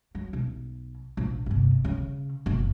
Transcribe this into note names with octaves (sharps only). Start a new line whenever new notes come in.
F#3
B1
A#1
G1 C3
C#3
F#1 B2